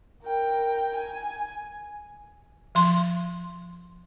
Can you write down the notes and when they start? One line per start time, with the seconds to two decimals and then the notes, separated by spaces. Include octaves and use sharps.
0.24 A#4 G5
0.95 G#5
2.75 F3 C6